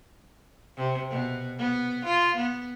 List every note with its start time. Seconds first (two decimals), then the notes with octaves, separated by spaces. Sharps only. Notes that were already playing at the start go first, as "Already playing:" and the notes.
0.77 C3
1.10 B2
1.58 B3
2.05 F4
2.36 B3